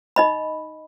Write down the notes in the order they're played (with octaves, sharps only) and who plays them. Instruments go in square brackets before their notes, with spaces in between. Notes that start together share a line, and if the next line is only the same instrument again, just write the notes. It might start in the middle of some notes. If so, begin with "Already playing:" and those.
[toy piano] D#4 D#5 B5